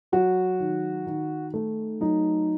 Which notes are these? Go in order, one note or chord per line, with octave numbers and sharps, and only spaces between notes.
F#3 F#4
D#3
D#3
A3
F#3 D#4